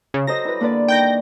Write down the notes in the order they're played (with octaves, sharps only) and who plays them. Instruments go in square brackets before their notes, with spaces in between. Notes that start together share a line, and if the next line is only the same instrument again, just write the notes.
[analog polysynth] C#3
[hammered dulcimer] F#3 A#5 [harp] A4 C5 D#5 [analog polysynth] A#6
[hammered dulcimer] G3 [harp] E4 B4
[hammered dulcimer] D3 [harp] A#3 B4 D5
[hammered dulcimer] D#3 [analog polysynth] G5 G6 A#6